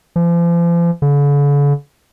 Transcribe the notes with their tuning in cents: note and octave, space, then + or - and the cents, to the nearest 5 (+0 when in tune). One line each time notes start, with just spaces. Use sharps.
F3 -40
D3 -45